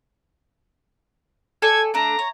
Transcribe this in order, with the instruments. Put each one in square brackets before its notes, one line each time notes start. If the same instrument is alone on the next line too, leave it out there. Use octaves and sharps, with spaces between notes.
[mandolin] A4 D5 G#5 [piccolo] G#6
[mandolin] A3 D4 [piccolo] A#5
[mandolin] C#5